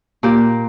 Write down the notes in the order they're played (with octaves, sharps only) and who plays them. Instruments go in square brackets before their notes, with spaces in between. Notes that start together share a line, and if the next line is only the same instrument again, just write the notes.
[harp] A#2 G4